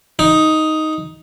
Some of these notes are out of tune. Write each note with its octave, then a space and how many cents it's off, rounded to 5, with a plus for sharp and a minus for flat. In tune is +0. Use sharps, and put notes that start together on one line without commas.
D#4 +5